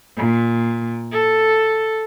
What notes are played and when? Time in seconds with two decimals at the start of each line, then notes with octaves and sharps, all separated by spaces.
0.17 A#2
1.12 A4